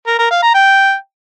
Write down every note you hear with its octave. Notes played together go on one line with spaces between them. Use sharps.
A#4
A#4
F5
A#5
G5